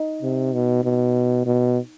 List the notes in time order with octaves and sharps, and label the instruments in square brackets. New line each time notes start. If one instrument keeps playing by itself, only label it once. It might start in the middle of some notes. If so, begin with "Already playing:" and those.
Already playing: [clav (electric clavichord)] D#4
[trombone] C3
B2
B2
B2